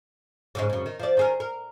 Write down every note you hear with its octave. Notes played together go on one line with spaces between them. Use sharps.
G#2 C#3 G#3
F#2 C#3
D#3
F3 D5
D#3 G#4 A#4
A#4